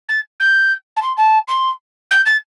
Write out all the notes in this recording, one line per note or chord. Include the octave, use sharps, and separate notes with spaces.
A6
G6
A5
C6
A5
C6
G6
A6